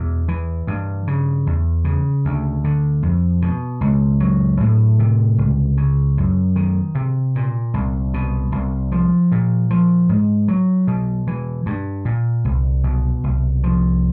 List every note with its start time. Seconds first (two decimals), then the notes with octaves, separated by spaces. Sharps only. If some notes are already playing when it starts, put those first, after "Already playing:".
Already playing: E2 B2
0.28 E3
0.67 G2
1.07 C#3
1.46 E2
1.85 C#3
2.25 D2
2.64 D3
3.03 F2
3.42 B2
3.81 C#2
4.20 F#3
4.60 A2
4.99 C3
5.38 C#2
5.77 C#3
6.17 F#2
6.56 D#3
6.95 C3
7.35 A#2
7.74 C2
8.14 B2
8.52 C2
8.92 F3
9.32 A#2
9.70 F3
10.09 G#2
10.48 F#3
10.87 B2
11.27 E3
11.66 G2
12.05 A#2
12.45 C2
12.84 B2
13.24 C2
13.63 F3